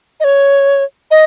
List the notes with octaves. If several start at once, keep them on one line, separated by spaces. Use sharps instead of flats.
D#5
C#5
D#5